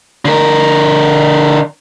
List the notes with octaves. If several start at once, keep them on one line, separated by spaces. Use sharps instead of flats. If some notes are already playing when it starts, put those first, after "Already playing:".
D3 A#4